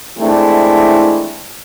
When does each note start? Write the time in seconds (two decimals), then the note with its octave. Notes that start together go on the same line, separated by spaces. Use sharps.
0.17 E3 G#3 A3 C4 D4 E4